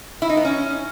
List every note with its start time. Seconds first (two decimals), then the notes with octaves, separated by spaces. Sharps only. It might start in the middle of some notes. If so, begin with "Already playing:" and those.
0.22 E4
0.29 D#4
0.37 B3
0.45 C#4